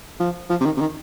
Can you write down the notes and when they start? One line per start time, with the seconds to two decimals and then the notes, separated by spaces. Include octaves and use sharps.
0.20 F3
0.50 F3
0.61 C3
0.65 D#3
0.77 C3
0.81 D#3